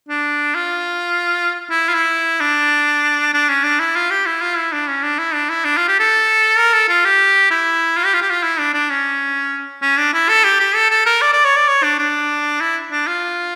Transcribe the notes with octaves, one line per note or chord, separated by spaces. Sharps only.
D4
F4
E4
F4
E4
D4
D4
C#4
D4
E4
F4
G4
E4
F4
E4
D4
C#4
D4
E4
D4
E4
D4
F4
G4
A4
A#4
A4
F4
G4
E4
F4
G4
F4
G4
F4
E4
D4
D4
C#4
C#4
D4
E4
A4
G4
G4
A4
A4
A#4
D5
D5
C#5
D5
C#5
D4
D4
E4
D4
F4